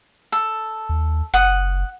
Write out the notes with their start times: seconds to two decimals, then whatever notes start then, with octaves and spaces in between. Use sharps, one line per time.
0.32 A4
0.89 D#2
1.34 F#1 F#5 D#6